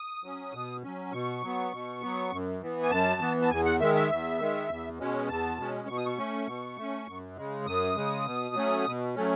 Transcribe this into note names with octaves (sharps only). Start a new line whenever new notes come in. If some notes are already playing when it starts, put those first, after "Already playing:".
Already playing: D#6
F#3 C#4
B2
F#3 C#4
B2 C#6
F#3 B3
B2
F#3 B3
F#2
E3 B3
G#5
F#2 A5
E3 B3
A5
E2 G#5
F#5
D#3 G#3 E5
E5
E2
D#3 G#3
E2
B2 G#3 C#4
E2 A5
B2 G#3 C#4
B2 C#6
D#6
C#6
A3 C#4
B2
A3 C#4
F#2
C#3 G#3
F#2 D#6
C#3 G#3
B2
F#3 A3 C#4
B2
F#3 A3 C#4